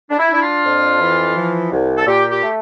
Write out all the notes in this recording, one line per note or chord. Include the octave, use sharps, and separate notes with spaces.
D4
E4
D4 E4
F4
F2
E3
F3
C2
A4
A#2 G4
G4
A3